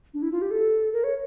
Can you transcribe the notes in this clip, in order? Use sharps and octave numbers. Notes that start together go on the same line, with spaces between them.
D4
E4
F4
G4
A4
A#4
C#5